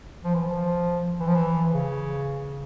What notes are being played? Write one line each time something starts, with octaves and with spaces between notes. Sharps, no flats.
F3
E3
F3
E3
F3
E3
C#3